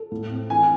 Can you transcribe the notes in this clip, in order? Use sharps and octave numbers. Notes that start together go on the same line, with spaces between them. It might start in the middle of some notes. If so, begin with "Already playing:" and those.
Already playing: A4
A2
C4
E3 G#5